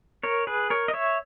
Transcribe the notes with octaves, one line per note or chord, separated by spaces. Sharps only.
A#4 C#5
G#4 B4
A#4 C#5
D#5
C#5 E5